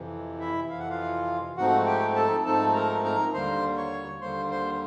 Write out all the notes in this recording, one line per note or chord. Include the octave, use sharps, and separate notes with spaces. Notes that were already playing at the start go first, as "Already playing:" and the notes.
Already playing: F2 C3 E3
E4 E5
F2 C3 E3 F5
F#5
F4 F5
G#2 F3 A3 C4 D#4 F#4 F#5
G4 G5
A4 A5
G#2 F3 A3 C4 D#4 A4 A5
A#4 A#5
A#4 A#5
D#2 D3 G3 A#3 C5 C6
C#5 C#6
D#2 D3 G3 A#3 C5 C6
C5 C6